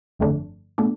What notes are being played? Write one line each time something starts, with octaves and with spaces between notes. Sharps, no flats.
G1 F2 D3 A3 D4
B2 A3 D4